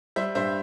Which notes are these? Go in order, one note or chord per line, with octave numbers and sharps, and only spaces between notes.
G3 C5 E5
G2 C5 E5